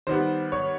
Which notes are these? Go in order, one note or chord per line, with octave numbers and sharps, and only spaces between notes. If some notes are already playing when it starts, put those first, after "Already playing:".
D#3 G3 B3 C5
C#5